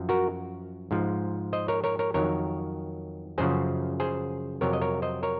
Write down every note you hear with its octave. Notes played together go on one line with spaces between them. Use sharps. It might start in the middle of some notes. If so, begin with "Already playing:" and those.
Already playing: F#2 F3
F#4 A#4
G#2 F3
C5 D#5
A#4 C#5
A#4 C#5
A#4 C#5
F2 D#3 F#3 A#4 C#5
F#2 C#3 F3 G#4 C5
G#4 C5
F2 C3 F#3 A#4 C#5
D#5
A#4 C#5
C5 D#5
A#4 C#5